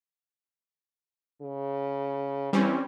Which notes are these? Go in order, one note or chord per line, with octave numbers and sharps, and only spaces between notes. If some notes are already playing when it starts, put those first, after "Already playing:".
C#3
E3 G3 C4 C#4